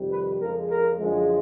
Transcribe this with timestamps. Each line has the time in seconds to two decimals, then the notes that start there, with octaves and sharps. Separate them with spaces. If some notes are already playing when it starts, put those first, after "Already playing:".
Already playing: F2 C3 D#3 G3
0.11 B4
0.40 F2 C#3 F3 G#3 A#4
0.69 A#4
0.99 F#2 D3 F3 G#3